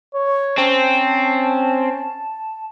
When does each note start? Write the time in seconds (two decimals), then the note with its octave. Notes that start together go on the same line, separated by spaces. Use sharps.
0.14 C#5
0.58 C4 C#4 A5